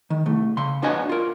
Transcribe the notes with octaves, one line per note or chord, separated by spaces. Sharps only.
D#3
C2 A3
C#3 C6
B3 D4 F#4 C#5 D#5 G#5
F4 A#4